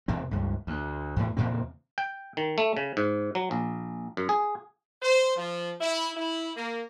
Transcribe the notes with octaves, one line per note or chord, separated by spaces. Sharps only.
E2 C3 C4
C#2 G2
D2
E2 A2
E2 A#2 C#3 C4
G5
D#3
A3
C#3
G#2
F#3
A#1
F#2
G#4
C5
F3
E4
E4
A#3